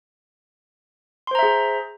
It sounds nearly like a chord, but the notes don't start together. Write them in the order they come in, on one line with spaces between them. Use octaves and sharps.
C6 C5 A#5 E5 G#4